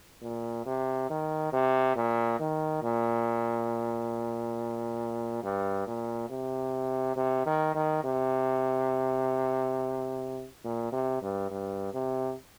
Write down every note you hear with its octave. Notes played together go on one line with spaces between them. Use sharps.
A#2
C3
D#3
C3
A#2
D#3
A#2
G2
A#2
C3
C3
D#3
D#3
C3
A#2
C3
G2
G2
C3